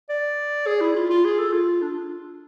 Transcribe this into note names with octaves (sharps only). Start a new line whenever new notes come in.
D5
G#4
E4
F4
F4
G#4
A4
F4
D4